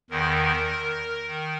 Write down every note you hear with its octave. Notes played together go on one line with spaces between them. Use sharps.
E2 D#3 A#4
D#3